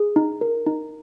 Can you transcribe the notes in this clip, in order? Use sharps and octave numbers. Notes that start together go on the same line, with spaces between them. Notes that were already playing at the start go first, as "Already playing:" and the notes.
Already playing: G#4
D#4
A#4
D#4